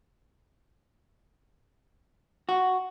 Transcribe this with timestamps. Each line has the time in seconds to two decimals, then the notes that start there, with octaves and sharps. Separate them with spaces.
2.49 F#4